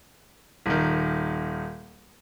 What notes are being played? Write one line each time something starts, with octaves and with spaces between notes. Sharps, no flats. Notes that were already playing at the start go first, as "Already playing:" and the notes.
D#1 D#3